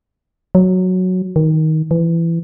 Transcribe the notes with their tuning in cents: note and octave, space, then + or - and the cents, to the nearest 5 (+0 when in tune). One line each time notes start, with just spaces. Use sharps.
F#3 -5
D#3 +15
E3 +20